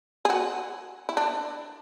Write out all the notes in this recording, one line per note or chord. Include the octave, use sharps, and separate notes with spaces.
G#4
F#4
E4
D4